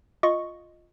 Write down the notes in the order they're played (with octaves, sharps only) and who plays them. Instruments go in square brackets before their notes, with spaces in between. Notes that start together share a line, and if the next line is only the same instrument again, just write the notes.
[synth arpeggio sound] F4 D#5 C#6